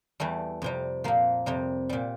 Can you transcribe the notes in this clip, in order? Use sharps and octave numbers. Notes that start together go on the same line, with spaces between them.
E2 E3 G3 A3
F2 C3 G3
A#2 F3 A#3
F2 C3 G3
A#2 G3